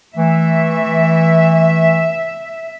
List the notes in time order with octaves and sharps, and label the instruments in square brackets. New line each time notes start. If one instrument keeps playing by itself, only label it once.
[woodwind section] E3 A3 [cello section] E5